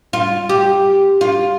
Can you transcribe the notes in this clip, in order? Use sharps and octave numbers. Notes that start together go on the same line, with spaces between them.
F4
G4
F4